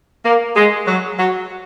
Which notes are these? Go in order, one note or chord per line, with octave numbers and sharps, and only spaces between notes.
A#3
G#3
F#3
F#3